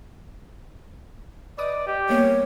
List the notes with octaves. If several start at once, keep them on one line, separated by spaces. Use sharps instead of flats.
B4 D5 D#5 D#6
G4
G3 A#3 B3 C#5